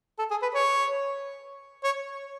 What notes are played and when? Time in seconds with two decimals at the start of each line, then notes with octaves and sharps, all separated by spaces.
0.19 A4
0.31 G#4
0.42 B4
0.54 C#5
1.84 C#5